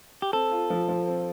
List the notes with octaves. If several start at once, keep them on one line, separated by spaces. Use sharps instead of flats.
G4
C4 A4
F4
F3
F3
C4